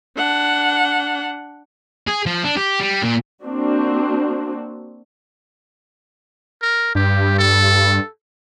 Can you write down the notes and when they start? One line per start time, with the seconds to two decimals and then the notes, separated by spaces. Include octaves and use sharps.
0.17 D4 F#5
2.07 G#4
2.26 F3
2.45 D4
2.57 G4
2.81 G3
3.02 A#2
3.43 A#3 C4 D4 F#4
6.62 A#4
6.95 G2 G4
7.38 A4